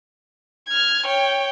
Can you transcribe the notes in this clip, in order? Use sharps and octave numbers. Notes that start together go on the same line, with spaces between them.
F6 G#6
C#5 G5